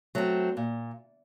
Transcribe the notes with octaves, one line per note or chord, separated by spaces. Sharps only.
F#3 A3 C4
A#2